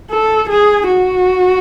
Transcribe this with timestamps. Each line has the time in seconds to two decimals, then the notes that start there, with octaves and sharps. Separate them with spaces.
0.10 A4
0.49 G#4
0.87 F#4